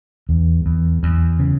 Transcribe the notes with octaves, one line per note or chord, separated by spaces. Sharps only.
E2
E2
E2
C#3